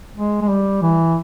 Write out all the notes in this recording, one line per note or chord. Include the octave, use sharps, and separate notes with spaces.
G#3
G#3
G3
E3